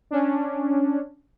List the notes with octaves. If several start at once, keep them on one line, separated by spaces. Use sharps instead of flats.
C#4 D4